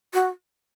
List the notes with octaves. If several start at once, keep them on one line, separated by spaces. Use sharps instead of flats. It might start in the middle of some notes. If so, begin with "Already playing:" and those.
F#4